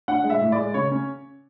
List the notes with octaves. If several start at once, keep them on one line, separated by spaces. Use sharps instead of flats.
D4 F#5
G#3
E5
A2
D5
G#3
C#3 C#5
C#4